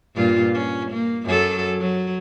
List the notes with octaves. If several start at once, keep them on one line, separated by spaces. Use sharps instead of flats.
G2 A#2 F4
C#4
A#3
F#2 F#3 A4
F#3